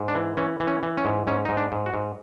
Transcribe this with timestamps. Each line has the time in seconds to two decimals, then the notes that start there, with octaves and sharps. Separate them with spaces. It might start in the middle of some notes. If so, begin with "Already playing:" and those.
Already playing: G#2
0.08 D4
0.15 E3
0.37 E3 C#4
0.60 E3
0.67 C#4
0.83 E3
0.97 C#4
1.05 G#2
1.27 G#2 C#4
1.45 G#2 D#4
1.57 D4
1.72 G#2
1.86 F#4
1.94 G#2